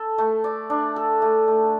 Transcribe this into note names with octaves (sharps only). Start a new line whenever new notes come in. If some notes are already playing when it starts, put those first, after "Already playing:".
Already playing: A4
A3
D5
D4
A4
A3
A3